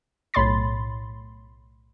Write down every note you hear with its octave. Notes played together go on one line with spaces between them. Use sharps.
B1 A2 C#5 B5 C6 A6